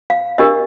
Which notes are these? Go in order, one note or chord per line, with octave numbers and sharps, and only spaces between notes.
F5
D4 G4 A#4 D#5